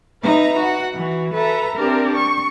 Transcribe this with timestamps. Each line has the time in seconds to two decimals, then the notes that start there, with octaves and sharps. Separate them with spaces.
0.22 D#4 B4 E5 A#5
0.58 F#4 F#5
0.95 E3 F#4
1.32 A4 B4 E5 A#5
1.75 C4 D4 G4 A#4
2.14 C#6